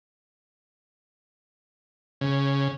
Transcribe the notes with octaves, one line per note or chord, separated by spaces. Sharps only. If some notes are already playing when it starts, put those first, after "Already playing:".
C#3